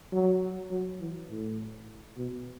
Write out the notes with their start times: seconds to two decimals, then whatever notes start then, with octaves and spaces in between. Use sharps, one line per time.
0.12 F#3
0.71 F#3
1.00 E3
1.30 A2
2.17 B2